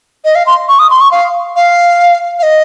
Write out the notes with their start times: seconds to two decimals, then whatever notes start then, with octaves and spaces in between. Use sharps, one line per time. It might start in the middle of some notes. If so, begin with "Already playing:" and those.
0.25 D#5
0.35 F5
0.47 C6
0.69 C#6
0.79 D#6
0.91 C6
1.01 C#6
1.12 F5
1.56 F5
2.39 F5
2.43 D#5